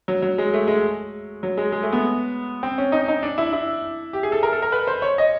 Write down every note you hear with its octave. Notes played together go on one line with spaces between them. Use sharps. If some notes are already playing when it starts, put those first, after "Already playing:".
F#3
F#3
G#3
A3
G#3
F#3
G#3
G#3
A3
B3
C4
C#4
D#4
D#4
D4
E4
E4
G4
G#4
A4
A#4
A4
A#4
B4
C5
C#5
D#5